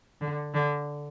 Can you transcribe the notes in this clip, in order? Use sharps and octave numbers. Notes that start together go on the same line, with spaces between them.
D3
D3